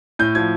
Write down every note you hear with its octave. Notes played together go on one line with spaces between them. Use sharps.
A2 G6
F3 G#6